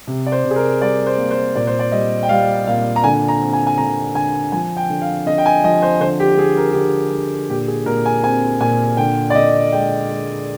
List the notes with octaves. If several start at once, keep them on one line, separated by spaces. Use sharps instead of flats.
C3
D5
C5
C3
G#4
A#4
G3 D5
C5
A#3
C5
A#2 D5
C5
D5
G3 D#5
G5
G3 F5
A#2 F5
A#5
D3 G#5
A#5
C4
G#5
G#5
D3 A#5
D3 G#5
F3 G#5
G5
D3
F5
D3 D#5
G5
G#5
F3 D#5
C5
D3 C5
G4
D3 G#4
A#4
G4
D3 G#4
D3
A#2 G4
G#4
A#2 A#4
G#5
C4 G#5
A#2 G#5
D3 G5
D5
D3 D#5
G#3 G5
G#3